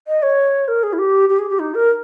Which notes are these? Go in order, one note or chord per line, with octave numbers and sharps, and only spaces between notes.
D#5
C#5
A#4
G#4
E4
G4
G4
G#4
G4
D#4
A#4